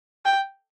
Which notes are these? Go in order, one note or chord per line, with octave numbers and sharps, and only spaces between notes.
G5